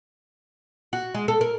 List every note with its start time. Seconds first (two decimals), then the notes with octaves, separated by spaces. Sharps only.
0.93 F#4
1.14 G#3
1.28 A4
1.41 A#4